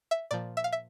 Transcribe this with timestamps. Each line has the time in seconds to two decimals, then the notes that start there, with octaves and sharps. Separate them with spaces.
0.11 E5
0.31 A#2 F3 D5
0.57 E5
0.64 F5
0.72 E5